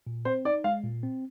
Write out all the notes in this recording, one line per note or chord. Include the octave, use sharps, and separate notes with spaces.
A#2
C4 C5
D#4 D5
G#3 F5
A#2
C4